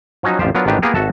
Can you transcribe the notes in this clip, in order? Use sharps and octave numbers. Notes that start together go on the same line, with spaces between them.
F3 F#3 C#4 D#4 F#4
A1 F2 F3 G4 C5
F#3 B3 D4 F4 A#4
A1 G#2 D#3 D4 G4 B4
A#3 B3 F4 G4 G#4 A#4
G#1 F#4 A4 E5 A5